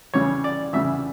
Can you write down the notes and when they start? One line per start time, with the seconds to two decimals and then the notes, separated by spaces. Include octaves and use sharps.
0.14 E2 C#3 G3 C#5
0.44 D5
0.73 E2 C#3 G3 E5